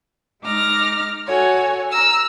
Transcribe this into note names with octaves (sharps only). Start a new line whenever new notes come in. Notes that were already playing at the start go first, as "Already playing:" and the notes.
G#3 D#4 D6 F6 A#6
F#4 A4 C#5 G#5
A#5 E6 F6